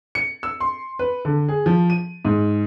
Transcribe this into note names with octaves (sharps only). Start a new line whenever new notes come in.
C#7
E6
C6
B4
D3
G#4
F3
D#7
G#2